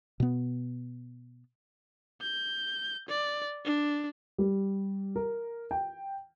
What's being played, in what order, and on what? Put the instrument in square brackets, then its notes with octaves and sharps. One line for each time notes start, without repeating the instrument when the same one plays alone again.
[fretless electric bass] B2 B3
[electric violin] G6
D5
D4
[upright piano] G3
A#4
G5